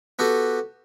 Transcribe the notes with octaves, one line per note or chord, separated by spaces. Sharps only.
B3 F#4 G4 A4